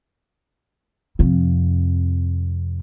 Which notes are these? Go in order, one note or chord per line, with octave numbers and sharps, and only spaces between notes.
F2 C3